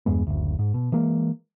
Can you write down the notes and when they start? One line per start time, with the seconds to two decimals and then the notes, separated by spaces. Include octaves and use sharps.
0.06 E2 G2 G#3 B3
0.27 F#1 D2
0.59 G#2
0.74 B2
0.92 E3 G#3 A#3